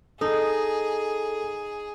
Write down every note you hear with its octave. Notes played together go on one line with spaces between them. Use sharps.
D#4 G#4 A4